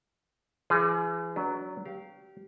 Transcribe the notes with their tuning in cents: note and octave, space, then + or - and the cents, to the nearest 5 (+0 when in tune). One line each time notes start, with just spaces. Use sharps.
E3 +40 G#4 +0
F#3 +5 D4 -30 B4 +0
G4 -25 F5 +0